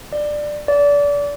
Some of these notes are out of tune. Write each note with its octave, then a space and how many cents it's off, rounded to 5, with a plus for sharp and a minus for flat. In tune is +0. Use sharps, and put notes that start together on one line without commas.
D5 +10
D5 -30